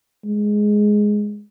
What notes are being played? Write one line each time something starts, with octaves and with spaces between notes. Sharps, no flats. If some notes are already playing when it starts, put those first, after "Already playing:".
G#3